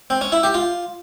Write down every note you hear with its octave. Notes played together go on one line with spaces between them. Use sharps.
C4
C#4
E4
G4
F4